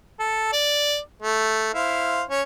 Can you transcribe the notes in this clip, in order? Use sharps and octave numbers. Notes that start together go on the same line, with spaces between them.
A4
D5
A3
E4 C5 F5
C#4 C#5